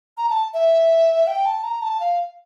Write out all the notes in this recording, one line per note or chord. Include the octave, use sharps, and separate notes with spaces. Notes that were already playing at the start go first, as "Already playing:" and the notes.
A#5
A5
E5
G5
A5
A#5
A5
F5